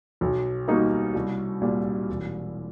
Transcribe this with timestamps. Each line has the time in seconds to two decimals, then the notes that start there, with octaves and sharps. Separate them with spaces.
0.21 B1
0.68 B2 G3 A#3 D#4
1.14 C2
1.62 A#2 G3
2.09 E1